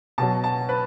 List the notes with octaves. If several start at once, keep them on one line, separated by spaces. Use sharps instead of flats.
B2 F#3 A5
A5
B4